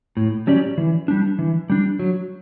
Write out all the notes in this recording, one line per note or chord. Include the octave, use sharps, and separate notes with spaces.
A2
F#3 C#4 G4 D5
E3
G3 D4
E3
G3 D4
F#3